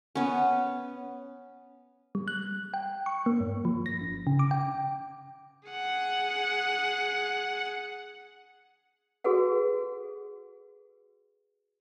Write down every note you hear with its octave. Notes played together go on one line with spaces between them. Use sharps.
B3 C#4
G3
F#6
G5
C#6
A#3
G2
F3
A#6
G1
C#3
D6
G5
G#4 F#5
F#4 G#4 A4 B4 F#5